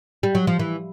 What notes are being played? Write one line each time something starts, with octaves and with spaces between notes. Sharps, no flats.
G3
F#3
F3
E3